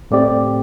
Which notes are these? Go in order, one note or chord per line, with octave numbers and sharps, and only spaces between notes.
A2 A3 C4 G4 D5